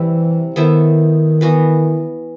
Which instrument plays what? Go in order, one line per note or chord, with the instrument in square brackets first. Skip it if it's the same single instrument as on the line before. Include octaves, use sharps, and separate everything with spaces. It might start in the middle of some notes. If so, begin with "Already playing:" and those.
Already playing: [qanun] C3 G3 C4 E4 [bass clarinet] E3
[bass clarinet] D#3 [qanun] B3 E4 A4 C5
[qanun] E3 B3 F#4 B4